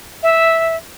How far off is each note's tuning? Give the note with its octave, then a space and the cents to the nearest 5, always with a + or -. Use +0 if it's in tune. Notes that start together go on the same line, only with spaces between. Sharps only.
E5 -5